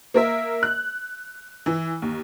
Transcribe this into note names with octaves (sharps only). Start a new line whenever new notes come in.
A#3 A#4 E5
F#6
E3
D#2